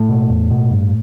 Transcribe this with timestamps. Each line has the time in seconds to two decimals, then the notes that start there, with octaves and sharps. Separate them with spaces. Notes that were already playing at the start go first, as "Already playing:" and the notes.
Already playing: A2 A3
0.09 B2
0.30 E2
0.50 B2
0.71 G2